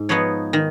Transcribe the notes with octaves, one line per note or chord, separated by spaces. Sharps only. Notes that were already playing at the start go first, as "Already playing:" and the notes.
Already playing: G#2
F3 B3 D#4 C#5
D#3